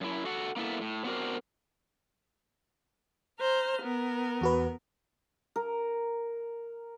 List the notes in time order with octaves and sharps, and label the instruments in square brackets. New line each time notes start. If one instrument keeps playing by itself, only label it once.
[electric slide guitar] F#2 E4
F#4 A4 F#5
A#3 B3 E4 A4 E5
A2
B3 C4 D4 F#4 A#4 C5
[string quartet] C5 A#5 F6
B3 A#4
[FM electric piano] E2 F#4 B4
[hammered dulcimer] A#4